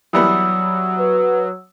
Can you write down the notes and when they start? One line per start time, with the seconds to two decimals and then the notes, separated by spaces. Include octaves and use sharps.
0.13 E3 F#3 G3 B3 F#5 D#6 E6
0.99 B4